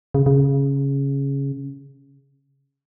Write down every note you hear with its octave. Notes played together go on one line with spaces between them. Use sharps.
C#3
C#3